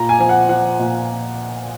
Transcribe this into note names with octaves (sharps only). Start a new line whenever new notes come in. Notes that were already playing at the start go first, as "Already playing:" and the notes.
Already playing: A#2 A#5
G#5
F3 G#5
F#5
F3 F#5
A#2